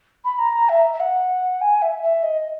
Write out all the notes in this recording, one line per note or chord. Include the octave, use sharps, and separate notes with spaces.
B5
A#5
E5
E5
F#5
G#5
E5
E5
D#5